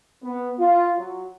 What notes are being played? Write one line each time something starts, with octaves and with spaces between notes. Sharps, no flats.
B3
F4
F#3